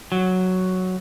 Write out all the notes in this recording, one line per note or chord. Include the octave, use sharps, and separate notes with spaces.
F#3